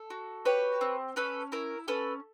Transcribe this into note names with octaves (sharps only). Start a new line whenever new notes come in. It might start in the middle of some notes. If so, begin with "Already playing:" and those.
Already playing: A4
F#4
G4 B4 C#5
C4
C#4 A4 B4
E4 A#4
C#4 A4 B4